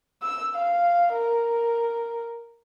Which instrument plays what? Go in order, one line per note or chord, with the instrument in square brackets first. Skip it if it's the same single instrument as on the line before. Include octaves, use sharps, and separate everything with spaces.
[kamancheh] E6
F5
A#4